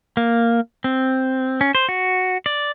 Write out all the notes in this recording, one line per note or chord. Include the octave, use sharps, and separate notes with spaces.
A#3
C4
C#4
C5
F#4
D5